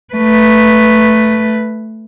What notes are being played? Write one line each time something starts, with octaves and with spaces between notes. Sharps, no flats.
A3 B4